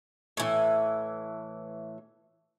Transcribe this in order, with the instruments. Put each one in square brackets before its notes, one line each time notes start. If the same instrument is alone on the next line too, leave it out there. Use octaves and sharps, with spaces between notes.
[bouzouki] A2 E3